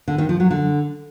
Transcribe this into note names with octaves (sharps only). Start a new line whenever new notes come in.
D3
D#3
F3
F#3
D3